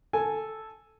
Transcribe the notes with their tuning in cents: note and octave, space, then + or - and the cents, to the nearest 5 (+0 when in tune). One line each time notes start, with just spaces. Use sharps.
A4 -5 G#5 +0